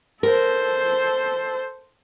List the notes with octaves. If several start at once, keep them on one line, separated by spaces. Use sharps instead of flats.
A4 A#4 C5